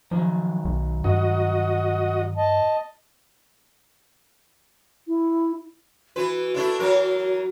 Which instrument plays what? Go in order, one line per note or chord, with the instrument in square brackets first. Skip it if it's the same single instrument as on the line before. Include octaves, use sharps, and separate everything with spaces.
[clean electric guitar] D#3 F#3 [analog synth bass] F3
[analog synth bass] B1
[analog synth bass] G2 [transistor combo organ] F#4 D#5
[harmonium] D#5 A5
[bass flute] E4
[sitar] E3 B4 [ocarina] F#4
[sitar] A3 D4 E4
E3 F#3 A#4